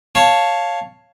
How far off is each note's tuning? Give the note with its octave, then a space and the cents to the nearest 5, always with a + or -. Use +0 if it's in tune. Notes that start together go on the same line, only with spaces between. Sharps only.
C#5 +0 F5 +0 A5 +0